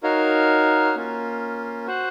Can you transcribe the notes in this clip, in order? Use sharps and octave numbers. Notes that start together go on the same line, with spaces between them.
D#4 F#4 A#4 C#5 F5
A#3 C#4 F4
F#4 C5 F#5